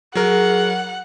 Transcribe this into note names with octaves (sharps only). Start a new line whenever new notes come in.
F#3 G#4 A#4 F#5